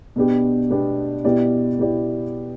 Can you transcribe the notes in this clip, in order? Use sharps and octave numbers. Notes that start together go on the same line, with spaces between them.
B2 B3 D4 G4
B2 B3 D4 G4
B2 B3 E4 G4 D5
B2 B3 E4 G4 D5